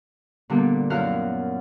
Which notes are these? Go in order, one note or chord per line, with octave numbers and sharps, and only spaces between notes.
A#2 D3 G3 B3
F#2 F#3 E4 F5 F#5 F#6